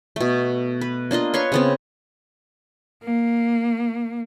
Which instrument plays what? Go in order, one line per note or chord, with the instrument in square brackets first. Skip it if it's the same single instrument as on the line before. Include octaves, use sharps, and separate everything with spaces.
[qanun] B2 A3
B4
A#3 D4 F4 D#5
B4 C#5 C6 C#6
C#3 B3 C4
[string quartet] A#3